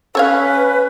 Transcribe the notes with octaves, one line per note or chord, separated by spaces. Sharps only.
C#4 A4 B4 C#5 F5